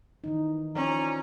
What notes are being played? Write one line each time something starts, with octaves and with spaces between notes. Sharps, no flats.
D#3 E3 D#4
F3 C#4 D5 A#5